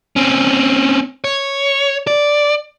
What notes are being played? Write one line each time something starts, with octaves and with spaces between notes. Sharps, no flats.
C4 C#4
C#5
D5